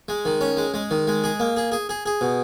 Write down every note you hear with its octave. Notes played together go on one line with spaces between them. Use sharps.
G#3
D#3
C#4
G#3
G#3
D#3
G#3
G#4
A#3
G#4
G#4
G#4
G#4
B2